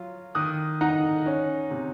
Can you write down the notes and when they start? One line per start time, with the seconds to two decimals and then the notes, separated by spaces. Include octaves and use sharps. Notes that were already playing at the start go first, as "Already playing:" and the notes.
Already playing: F#3 F4
0.35 D#3 D#6 F#6
0.81 D#4 F#5 A#5
1.26 C#4
1.71 C3